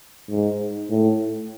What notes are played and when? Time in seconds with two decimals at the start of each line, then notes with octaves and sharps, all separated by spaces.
0.30 G#2
0.90 A2